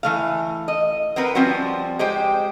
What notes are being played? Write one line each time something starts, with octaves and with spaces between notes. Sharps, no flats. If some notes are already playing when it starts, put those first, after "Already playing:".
E3 A3 F5
D#5
B3 C4 A#4 B4
F3 G3 C4 C#4 F#4
G#3 G4 C5 G5